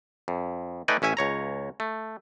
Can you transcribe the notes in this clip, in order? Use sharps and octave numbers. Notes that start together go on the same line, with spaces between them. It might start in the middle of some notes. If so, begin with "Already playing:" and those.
F2
A3 D#4 B4 D5 G5 G#5
A1 C#4 E5 G#5
C#2 C#5 A#5
A3